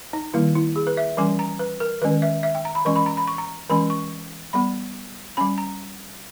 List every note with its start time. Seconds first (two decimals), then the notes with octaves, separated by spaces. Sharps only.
0.13 D#4
0.34 D#3 G3 A#3 E4
0.55 E4
0.76 G#4
0.87 B4
0.97 E5
1.17 E3 G3 C#4 G#5
1.39 A#5
1.59 B4
1.80 A#4
2.02 D#3 G#3 C#4 B4
2.22 E5
2.43 E5
2.55 G5
2.65 A#5
2.75 B5
2.85 E3 G#3 C#4 C#6
2.96 B5
3.06 A#5
3.17 B5
3.28 C#6
3.38 A#5
3.70 E3 G#3 C#4 B5
3.90 C#6
4.53 G3 B3 B5
5.37 G3 C#4 B5
5.58 A#5